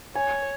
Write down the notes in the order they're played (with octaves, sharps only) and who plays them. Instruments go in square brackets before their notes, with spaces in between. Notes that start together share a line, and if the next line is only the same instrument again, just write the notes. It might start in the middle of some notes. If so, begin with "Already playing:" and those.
[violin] C#5 [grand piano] G#5